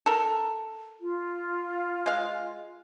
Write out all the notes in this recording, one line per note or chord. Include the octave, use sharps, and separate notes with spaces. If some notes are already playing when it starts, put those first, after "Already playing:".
A4 A#4
F4
G#3 F5